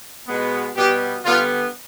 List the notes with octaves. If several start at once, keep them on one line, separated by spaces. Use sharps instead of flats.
B2 G#3 B3
B2 G3 B3 G4
D3 G3 B3 F4